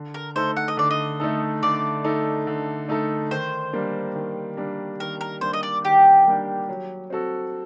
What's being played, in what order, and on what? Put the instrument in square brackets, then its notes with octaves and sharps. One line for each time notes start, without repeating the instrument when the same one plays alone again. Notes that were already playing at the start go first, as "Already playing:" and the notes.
Already playing: [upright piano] D3
[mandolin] A#4
[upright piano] A3 D#4 A4 [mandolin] C5
[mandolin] F#5
D#5
[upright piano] D3 [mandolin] D5
[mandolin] D#5
[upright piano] A3 D#4 A4
[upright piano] D3 [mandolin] D5
[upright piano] A3 D#4 A4
D3
A3 D#4 A4
[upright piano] D#3 [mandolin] C5
[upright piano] G3 A#3 D4
D#3
G3 A#3 D4
[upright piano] D#3 [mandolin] A#4
[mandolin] A#4
[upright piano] G3 A#3 D4 [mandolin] C5
[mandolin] D#5
D5
[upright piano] D#3 [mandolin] G4
[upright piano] G3 A#3 D4
F#3
C4 F#4 A4